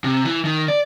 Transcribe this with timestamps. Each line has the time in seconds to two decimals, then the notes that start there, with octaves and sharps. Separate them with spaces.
0.04 C3
0.25 E3
0.45 D#3
0.68 D5